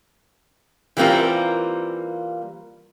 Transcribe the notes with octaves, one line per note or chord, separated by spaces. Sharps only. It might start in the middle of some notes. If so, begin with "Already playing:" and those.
E3 G3 A#3 C4 F4 A#4